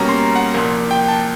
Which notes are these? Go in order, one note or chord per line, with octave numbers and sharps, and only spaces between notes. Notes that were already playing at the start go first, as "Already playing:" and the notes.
Already playing: B2 G3 A#3 C#4 A#5
C6
F#5
C2 A#2 F3 A#3
G5
A5